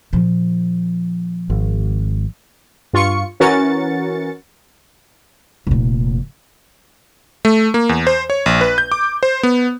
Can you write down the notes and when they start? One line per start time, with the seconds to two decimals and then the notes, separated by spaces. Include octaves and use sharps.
0.13 A#2 F3
1.50 G#1
2.93 G2 F4 C#6 C#7
3.40 E3 C#4 F#4 A#4 A6 C#7
5.67 F1 A#2
7.45 A3
7.74 A#3
7.89 E2
8.07 C5
8.30 C#5
8.46 A#1
8.61 B4
8.78 G6
8.92 D6
9.23 C5
9.43 B3